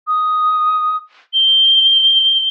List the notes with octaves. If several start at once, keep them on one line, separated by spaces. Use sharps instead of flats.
D#6
G7